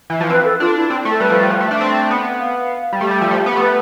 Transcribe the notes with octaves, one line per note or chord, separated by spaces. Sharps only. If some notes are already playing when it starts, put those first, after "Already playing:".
E3
F3
C4 B4
A4
D4 F4
E4
C4
A3
A4
G3 B4
F3
G3
F3
A3
D4 E5
C4
B3
F5
G3
A3 G4
G3
F3
A3
B3
A3
B3 B4